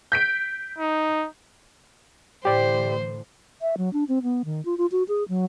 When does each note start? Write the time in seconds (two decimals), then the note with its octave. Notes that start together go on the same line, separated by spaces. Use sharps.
0.12 G6 B6 D7
0.79 D#4
2.45 A2 D3 E3 G4 C5 D5
3.62 E5
3.77 F#3
3.93 D4
4.08 C4
4.23 B3
4.45 D#3
4.65 F4
4.78 F4
4.92 F#4
5.08 G#4
5.29 F#3